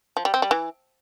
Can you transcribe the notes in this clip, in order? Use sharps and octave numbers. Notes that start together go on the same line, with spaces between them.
F3
G3
C4
G3
E3